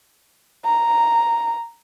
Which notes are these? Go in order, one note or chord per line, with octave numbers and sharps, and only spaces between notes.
A#5